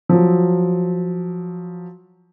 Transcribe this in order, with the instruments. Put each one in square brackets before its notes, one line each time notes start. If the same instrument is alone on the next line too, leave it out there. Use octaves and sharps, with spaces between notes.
[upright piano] F3 F#3